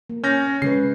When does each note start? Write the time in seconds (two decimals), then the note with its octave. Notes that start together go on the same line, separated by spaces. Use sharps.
0.10 A#3
0.24 C#4 G6 A#6
0.62 C#3 G#3 B4 C7